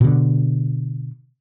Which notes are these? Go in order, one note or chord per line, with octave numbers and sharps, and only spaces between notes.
B2 D3